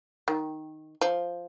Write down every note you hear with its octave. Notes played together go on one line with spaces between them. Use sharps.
D#3
F3